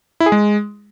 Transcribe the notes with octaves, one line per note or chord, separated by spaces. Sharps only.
E4
G#4
G#3